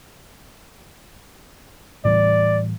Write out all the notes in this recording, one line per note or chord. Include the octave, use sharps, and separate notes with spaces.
A2 E3 G3 D5